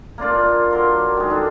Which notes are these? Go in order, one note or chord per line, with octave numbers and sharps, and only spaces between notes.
A#3 D4 F4 D5
F#3 A#4 C6
D#3 G#3
D4 A4